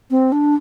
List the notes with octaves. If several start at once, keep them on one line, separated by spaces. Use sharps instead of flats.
C4
D4